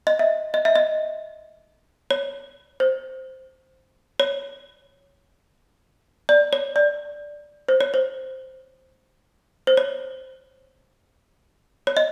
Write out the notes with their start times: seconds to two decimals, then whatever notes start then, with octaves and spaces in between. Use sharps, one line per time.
0.07 D#5
0.19 E5
0.54 D#5
0.65 E5
0.76 D#5
2.11 C#5
2.80 C5
4.20 C#5
6.29 D5
6.53 C#5
6.76 D5
7.68 C5
7.80 C#5
7.94 C5
9.67 C5
9.77 C#5
11.87 C#5
11.97 D#5